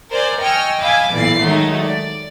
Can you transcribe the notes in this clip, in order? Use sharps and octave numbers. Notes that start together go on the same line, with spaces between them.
A#4 C5 D5 G#5
D#5 G5 G#5 C#6 E6 F6
D#5 F5 G#5 B5 D6 E6
B1 A#2 E3 D5 C7
D#3 F#3 G#3 A3 D#4
D5